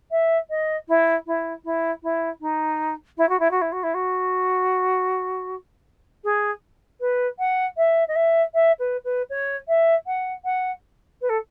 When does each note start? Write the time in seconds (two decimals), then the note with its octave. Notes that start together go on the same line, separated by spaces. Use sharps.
0.11 E5
0.50 D#5
0.88 E4
1.27 E4
1.65 E4
2.03 E4
2.41 D#4
3.17 E4
3.29 F#4
3.40 E4
3.51 F#4
3.62 E4
3.72 F#4
3.83 E4
3.94 F#4
6.24 G#4
7.01 B4
7.39 F#5
7.77 E5
8.08 D#5
8.16 E5
8.54 E5
8.79 B4
9.05 B4
9.30 C#5
9.68 E5
10.07 F#5
10.45 F#5
11.22 B4
11.29 A4